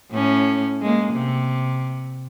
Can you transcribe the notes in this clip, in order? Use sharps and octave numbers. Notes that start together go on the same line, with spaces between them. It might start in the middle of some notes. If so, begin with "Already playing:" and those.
A2 C#4
G#3 A#3
C3